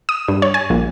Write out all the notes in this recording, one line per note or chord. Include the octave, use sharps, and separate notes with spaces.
D#6
G2
C#5
G#5
A#1